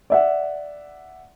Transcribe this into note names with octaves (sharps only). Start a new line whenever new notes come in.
D5 E5 F#5